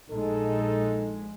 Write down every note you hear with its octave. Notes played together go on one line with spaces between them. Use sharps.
A#1 A#2 G#3 D#4 A4